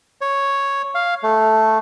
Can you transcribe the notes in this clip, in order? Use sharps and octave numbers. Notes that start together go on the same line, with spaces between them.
C#5
F5
A3